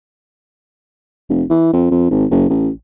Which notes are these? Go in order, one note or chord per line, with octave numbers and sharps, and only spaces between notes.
F1
E3
F2
F2
G#1
F#1
A1